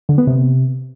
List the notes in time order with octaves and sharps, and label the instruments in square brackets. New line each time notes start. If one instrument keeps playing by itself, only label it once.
[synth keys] D3
B3
C3